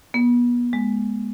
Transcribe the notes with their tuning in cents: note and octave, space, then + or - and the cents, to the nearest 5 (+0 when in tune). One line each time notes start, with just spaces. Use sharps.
B3 -30
G#3 +5